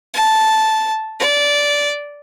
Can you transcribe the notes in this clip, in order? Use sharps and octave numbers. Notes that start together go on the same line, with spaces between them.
A5
D5